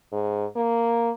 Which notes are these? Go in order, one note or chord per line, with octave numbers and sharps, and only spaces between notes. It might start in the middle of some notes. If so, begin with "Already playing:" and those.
G#2
A#3